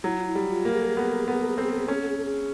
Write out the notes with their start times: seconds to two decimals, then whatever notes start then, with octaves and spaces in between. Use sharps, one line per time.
0.03 F#3 E4
0.20 F4
0.27 E4
0.35 G3
0.50 F4
0.65 A#3
0.73 G#4
0.80 A4
0.89 G#4
0.97 B3 A4
1.03 G#4
1.11 A4
1.19 G#4
1.27 B3 A4
1.34 G#4
1.41 A4
1.49 G#4
1.56 C4 A4
1.63 G#4
1.72 A4
1.79 G#4
1.87 C#4 A4
1.94 G#4
2.02 A4
2.09 G#4
2.18 A4
2.25 G#4